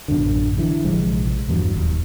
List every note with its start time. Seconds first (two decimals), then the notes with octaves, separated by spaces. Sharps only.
0.08 A1 F#2 B2 D3
0.58 D3 E3
0.84 A#1 C3 F3 G#3
1.48 E2 G2 E3 F#3
1.73 D#1 D#2